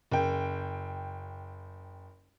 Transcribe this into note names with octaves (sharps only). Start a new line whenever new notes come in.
F#1 G5